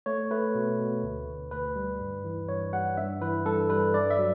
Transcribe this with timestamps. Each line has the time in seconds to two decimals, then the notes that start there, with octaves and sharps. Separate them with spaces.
0.06 A3 C#5
0.31 A3 B4
0.55 B2
0.79 B2
1.03 D2
1.28 D3
1.51 D2 B4
1.76 G3
2.00 G2
2.24 E3
2.49 G2 C#5
2.73 G3 F#5
2.97 G2 E5
3.21 E3 B4
3.45 G2 A4
3.70 G3 B4
3.94 G2 D5
4.10 E5
4.18 F#3